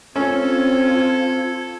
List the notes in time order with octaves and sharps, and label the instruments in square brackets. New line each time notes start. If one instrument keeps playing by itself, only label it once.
[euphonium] C4 [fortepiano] C#4 [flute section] F4 G#6 [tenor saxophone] A4